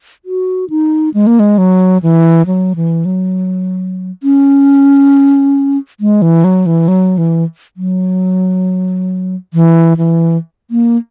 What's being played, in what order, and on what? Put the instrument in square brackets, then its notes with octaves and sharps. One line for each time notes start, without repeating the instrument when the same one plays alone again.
[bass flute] F#4
D#4
G#3
A#3
G#3
F#3
E3
F#3
E3
F#3
C#4
G#3
E3
F#3
E3
F#3
E3
F#3
E3
E3
A#3